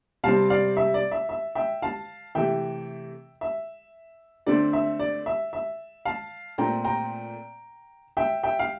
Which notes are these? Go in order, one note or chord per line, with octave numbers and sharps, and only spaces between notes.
C3 G3 C4 F5 A5
D5 F5
E5
D5
E5
E5
E5 G5
F5 A5
C3 E3 A3 E5 G5
E5
D3 A3 C4 D5
E5
D5
E5
E5
F5 A5
A#2 A3 C4 G5 A#5
G5 A#5
E5 G5
E5 G5
F5